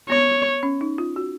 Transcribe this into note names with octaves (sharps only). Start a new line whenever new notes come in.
B3 C#5
C#4
D#4
F4
F#4